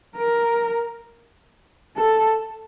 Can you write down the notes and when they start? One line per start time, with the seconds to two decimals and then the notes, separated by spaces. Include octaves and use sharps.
0.16 A#4
1.96 A4